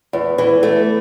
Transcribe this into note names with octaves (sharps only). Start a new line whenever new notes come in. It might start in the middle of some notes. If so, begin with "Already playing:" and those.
E2
E3
A3